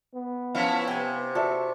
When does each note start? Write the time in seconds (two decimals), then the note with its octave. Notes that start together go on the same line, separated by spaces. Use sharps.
0.15 B3
0.55 F3 C#4 E4 F5 B6
0.87 C3 G5 G#5
1.35 F#4 A4 D5 E5